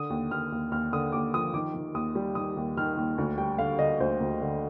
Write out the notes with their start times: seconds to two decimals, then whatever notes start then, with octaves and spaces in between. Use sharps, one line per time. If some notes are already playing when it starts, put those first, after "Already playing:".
Already playing: D3 D#6
0.10 D#2
0.31 D#2 F6
0.52 D#2
0.71 D#2 F6
0.93 D3 D#6
1.12 D#2 D6
1.34 F3 D#6
1.54 D#3 D6
1.75 D#3
1.94 D#2 D#6
2.15 G3
2.35 D#3 D#6
2.57 D#2
2.77 D#3 F6
2.97 D#2
3.18 D2
3.38 G3 G5
3.58 D3 F5
3.79 D3 D#5
4.00 D2 C5
4.21 D2
4.41 D3